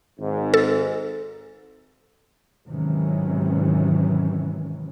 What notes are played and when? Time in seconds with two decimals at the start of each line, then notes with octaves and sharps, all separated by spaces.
0.19 G#1 G#2
0.54 A4
2.68 G#1 C3 D#3 E3 F#3 C#4